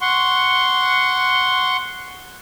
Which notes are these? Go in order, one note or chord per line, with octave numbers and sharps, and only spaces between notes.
F#5 C6 C#6